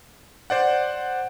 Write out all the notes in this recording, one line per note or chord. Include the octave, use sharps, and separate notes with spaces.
C5 D5 F#5